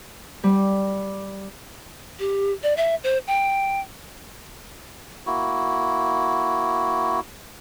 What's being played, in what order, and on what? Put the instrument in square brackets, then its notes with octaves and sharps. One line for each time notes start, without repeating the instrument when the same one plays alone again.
[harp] G3
[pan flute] G4
D5
E5
C5
G5
[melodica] A#3 E4 F#4